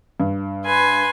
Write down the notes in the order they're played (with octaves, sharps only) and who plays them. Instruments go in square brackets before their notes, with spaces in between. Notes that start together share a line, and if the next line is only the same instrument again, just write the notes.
[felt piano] G2
[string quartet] B4 G#5 C6